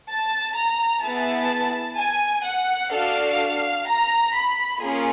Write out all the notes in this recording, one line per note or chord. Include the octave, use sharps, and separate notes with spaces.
A5
A#5
B3 E4 G#4 A5
G#5
F#5
D4 F#4 A4 F5
A#5
B5
A#3 C#4 F4 G#4